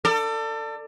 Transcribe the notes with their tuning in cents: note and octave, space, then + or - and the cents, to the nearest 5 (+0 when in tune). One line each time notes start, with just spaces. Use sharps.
A4 +30 D5 +10